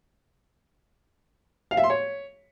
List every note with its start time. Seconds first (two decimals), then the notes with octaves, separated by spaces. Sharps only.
1.71 F5
1.77 E5
1.84 C6
1.90 C#5